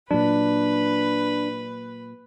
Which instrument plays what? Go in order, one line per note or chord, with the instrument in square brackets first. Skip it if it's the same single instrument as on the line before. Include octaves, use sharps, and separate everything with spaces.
[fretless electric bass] A#2 F#3 [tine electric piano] D4 [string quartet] B4